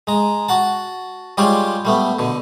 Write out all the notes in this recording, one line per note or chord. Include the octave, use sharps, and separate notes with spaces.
G#3 A#5
F#4 F#5 A5
G3 G#3 F4 G4 C#5 D5
G3 A3 B3
B2 D3